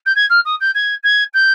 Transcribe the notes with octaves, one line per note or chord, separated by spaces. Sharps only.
G6
G#6
F6
D#6
G6
G#6
G#6
G6